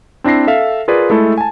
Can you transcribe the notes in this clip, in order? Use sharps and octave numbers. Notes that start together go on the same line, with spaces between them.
C4 D4 E4 A#6 C7
A4 E5 F5
F4 G#4 A#4 B4 D5
G#3 A3 E4 A4
G#5 A5